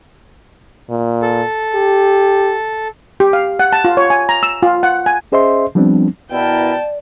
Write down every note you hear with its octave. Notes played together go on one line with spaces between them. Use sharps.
A#2
A4
G4
G4
F5
F#5
A5
F4
C#5
G#5
A#5
E6
F4
F#5
G#5
C#4 G#4 C5 D#5 E5 C6
F3 G3 B3 C4 D4
B2 E4 A#4 D5 G5 A5